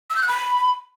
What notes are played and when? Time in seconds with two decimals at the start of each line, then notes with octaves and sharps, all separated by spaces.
0.10 E6
0.16 G6
0.22 F#6
0.28 B5